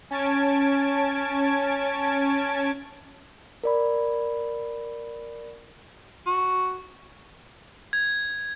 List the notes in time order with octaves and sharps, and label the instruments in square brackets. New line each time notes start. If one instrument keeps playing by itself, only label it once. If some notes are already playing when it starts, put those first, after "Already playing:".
[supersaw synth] C#4 A5 G#6 D7
[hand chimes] A#4 D5 B5
[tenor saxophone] F#4
[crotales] G#6